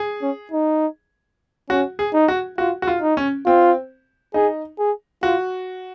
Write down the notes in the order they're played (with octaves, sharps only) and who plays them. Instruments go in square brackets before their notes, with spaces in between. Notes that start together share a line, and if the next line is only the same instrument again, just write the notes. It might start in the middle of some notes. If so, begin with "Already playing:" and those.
Already playing: [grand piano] G#4
[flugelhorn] C#4
D#4
[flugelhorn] C#4 [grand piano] F#4
[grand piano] G#4
[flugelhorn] D#4
[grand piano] F#4
[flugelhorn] F4 [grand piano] F#4
[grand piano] F#4
F4
[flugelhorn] D#4
[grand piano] C#4
[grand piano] C4 [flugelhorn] F4
[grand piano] D#4 [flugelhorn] G#4
[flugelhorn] G#4
[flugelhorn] F4 [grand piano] F#4